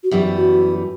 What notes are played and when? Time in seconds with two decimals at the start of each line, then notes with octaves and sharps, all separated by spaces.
0.04 F#4
0.11 F#2 E3 G3 B3 G4
0.37 F#4